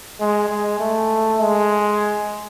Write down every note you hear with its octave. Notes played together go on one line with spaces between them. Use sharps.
G#3
G#3
A3
G#3